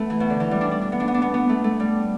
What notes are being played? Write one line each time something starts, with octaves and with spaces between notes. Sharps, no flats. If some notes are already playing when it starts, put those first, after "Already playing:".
Already playing: A3 B3
E3
B2
D3
E3
G3
D4
D4
D4
B3
D4
B3
D4
B3
B3
A3
A3
G3